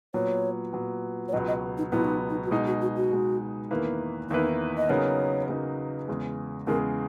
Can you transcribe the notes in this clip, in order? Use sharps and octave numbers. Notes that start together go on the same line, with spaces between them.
A#2 F#3 B3 C#5
A#2 F#3 B3
C#5
C#2 B2 F#3 B3 D#5
D#5
D#4
C#2 B2 F#3 B3 E4
D#4
D#4
F#4
B2 G#3 D#4 E4
F#4
F#4
F#4
B2 G#3 D#4
E2 D#3 A#3 E4 B4
E2 D#3 A#3 D#4 E4 B4
D#5
C#3 F#3 B3 D#4 A#4 C#5
C#3 F#3 B3 D#4 A#4
E2 C#3 G#3
E2 C#3 G#3 A#4